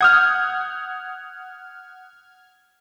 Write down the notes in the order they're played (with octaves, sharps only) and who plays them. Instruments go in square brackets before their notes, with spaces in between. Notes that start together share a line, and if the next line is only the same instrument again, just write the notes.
[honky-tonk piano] F#5 D#6 G6 [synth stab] F6 G#6